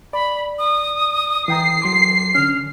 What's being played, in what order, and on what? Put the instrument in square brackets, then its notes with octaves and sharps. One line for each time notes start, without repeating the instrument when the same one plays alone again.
[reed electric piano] D5 [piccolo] B5
[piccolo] D#6
[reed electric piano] E3 G5 A#5 [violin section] C7
[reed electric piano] F#3 C6 D6
[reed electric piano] D3 C#4 [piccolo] F6